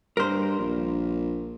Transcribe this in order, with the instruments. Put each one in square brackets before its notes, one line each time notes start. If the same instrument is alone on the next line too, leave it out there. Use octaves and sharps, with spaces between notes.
[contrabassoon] G2 [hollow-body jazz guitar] A#4 C5
[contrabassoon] A#1